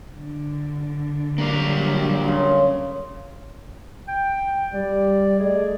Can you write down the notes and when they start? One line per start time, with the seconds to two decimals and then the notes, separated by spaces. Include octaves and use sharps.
0.13 D3
1.38 F#3 G3 A#3 D4 F5
2.24 C#3 C6
4.08 G5
4.73 G3 D5
5.40 A3 G#4 D5 D#5